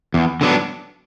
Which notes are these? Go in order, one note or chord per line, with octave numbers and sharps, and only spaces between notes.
E2
D3 F#3 B3 D4